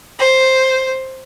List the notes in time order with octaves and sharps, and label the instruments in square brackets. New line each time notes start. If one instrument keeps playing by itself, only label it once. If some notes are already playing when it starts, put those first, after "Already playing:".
[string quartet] C5